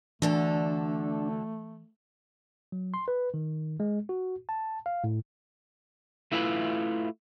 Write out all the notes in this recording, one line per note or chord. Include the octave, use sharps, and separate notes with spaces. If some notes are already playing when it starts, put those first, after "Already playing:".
D2 D3 E3 A3 D4 A4
F#3
C6
B4
D#3
G#3
F#4
A5
F5
A2
A3 E4 F4 B4